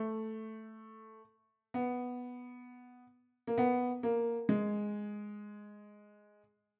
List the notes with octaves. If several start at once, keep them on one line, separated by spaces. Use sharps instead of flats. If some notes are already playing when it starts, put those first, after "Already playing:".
Already playing: A3
B3
A#3
B3
A#3
G#3